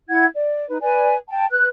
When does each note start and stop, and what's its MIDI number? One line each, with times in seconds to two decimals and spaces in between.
0.09 0.26 64
0.09 0.26 78
0.09 0.26 92
0.35 0.67 74
0.69 0.77 63
0.69 0.77 71
0.82 1.15 71
0.82 1.15 74
0.82 1.15 80
1.29 1.46 79
1.29 1.46 81
1.51 1.67 71
1.51 1.67 90